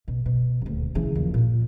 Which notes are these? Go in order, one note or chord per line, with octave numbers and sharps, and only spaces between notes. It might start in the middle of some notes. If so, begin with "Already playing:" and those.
B2
B2
D#1 D2
C#3 E3
D#2 F3
A#2 F4